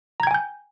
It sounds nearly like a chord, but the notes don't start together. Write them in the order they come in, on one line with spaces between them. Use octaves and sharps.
A#5 G#6 G5 G#5 G6